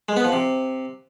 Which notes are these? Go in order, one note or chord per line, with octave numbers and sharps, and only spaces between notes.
G#3
B3
F3
C3